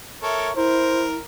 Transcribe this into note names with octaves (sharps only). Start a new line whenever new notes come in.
A4 A#4 C#5 E5
E4 A#4 C5